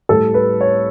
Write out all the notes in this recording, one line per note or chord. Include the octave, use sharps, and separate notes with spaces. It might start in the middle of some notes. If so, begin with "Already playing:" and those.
A2 G3 A4
B4
C#5